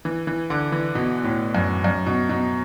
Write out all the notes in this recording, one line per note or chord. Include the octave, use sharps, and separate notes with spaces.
E3
E3
D3
E3
B2
A2
F#2
F#2
B2
B2